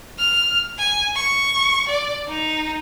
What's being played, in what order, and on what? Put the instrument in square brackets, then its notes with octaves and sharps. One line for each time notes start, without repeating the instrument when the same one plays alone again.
[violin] F6
G#5
C#6
D5
D#4